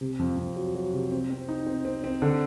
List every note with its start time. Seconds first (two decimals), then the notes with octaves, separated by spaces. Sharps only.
0.01 C3
0.19 F2
0.37 F2
0.56 F#3
0.75 F#3
0.93 C3
1.12 C4
1.30 C4
1.49 D#4
1.67 C4
1.85 C4
2.04 C4
2.22 D3